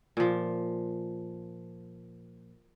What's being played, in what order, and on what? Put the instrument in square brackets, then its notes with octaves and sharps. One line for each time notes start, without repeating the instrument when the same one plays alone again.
[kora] A#2 F3